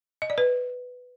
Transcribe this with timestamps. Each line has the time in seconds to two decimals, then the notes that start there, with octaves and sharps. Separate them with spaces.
0.22 D#5
0.30 D5
0.38 B4